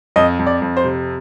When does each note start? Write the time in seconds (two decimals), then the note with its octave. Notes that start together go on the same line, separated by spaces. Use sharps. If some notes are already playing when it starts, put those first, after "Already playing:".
0.16 F2 D#5
0.39 F2
0.47 D5
0.62 F2
0.77 C5
0.84 C3